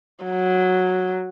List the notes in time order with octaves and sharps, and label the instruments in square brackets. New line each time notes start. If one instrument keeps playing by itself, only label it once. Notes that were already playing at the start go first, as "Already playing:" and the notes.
[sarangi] F#3